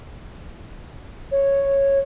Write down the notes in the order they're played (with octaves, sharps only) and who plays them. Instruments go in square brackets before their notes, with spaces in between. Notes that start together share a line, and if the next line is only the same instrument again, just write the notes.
[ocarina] C#5